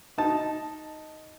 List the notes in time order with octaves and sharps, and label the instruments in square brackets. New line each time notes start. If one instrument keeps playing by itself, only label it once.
[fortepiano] D#4 A5